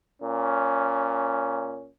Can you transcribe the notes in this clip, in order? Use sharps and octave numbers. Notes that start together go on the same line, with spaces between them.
A#2 C#4